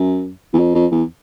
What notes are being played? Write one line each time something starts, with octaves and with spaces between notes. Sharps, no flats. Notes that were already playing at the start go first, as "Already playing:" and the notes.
Already playing: F#2
E2
F2
F2
E2